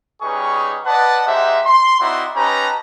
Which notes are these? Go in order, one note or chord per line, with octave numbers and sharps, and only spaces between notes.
G3 C#4 D#4 G#4 B4 C#6
B4 D5 D#5 F#5 A5
G#3 D#4 G4 C5 E5 F#5
C6
C4 D#4 E4 F#4 D5 C6
C#4 D#4 G4 B4 A5 A#5